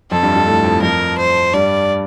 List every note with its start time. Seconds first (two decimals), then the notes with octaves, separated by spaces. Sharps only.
0.11 F2 F3 A4
0.23 G2 G3
0.35 G2 G3
0.46 A2 A3
0.64 F2 F3
0.82 F2 F3 A#4
1.18 C5
1.53 G2 G3 D5